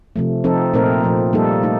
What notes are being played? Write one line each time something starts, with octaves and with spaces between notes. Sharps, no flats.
C3 F3 A3
F3 C4 D#4 A4
A#2 A3 C4 D#4 A#4
A#2 F3 A3
G3 A#3 D#4 A4
A3 D#4